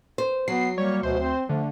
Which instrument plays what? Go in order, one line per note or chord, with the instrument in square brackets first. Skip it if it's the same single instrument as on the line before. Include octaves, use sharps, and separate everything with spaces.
[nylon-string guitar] C5
[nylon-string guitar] F#3 [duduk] B3 [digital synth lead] C7
[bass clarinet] G3 [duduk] A#3 [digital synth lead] C#5
[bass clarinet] D2 [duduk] B2 [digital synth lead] C5
[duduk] C4
[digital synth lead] D3 [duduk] F3 [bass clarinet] A3